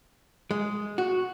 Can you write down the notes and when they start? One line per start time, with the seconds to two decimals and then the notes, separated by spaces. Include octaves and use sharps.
0.51 G#3
0.98 F#4